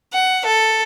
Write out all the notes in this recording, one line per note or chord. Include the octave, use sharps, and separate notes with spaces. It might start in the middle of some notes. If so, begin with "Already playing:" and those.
F#5
A4